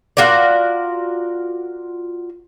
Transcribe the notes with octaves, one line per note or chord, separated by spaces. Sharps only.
F4 F#4 A#4 D5